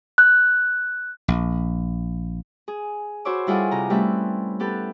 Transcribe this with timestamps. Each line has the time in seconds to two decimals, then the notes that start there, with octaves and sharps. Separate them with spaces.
0.18 F#6
1.28 A#1
2.68 G#4
3.25 F#4 C5 C#5 B5 D6 E6
3.47 G3 E4 F4 G#4 A4 F#5
3.71 C3 A#5
3.90 G3 A3 C4 C#4 B4 E5
4.60 B3 G4 A4 B4